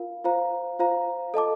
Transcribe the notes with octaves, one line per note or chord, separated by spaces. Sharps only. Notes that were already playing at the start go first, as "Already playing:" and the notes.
Already playing: F4 A#4 F5
F4 C5 F5 A#5
F4 C5 F5 A#5
A4 D#5 A5 D6